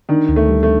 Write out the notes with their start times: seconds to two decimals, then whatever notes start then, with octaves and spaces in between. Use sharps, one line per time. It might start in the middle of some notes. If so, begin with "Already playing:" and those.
0.09 D#3 D4
0.29 D2
0.36 A3
0.49 G3
0.63 A3